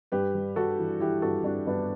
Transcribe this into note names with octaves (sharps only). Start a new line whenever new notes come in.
G2 G4 B4
G3
G3 F#4 A4
E3
E3 E4 G4
G2 F#4 A4
G2 D4 F#4
G2 B3 D4